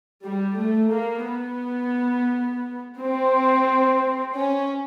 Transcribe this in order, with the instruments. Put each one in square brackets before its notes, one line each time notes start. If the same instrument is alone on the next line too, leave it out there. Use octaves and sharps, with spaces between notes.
[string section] G3
A3
A#3
B3
C4
C#4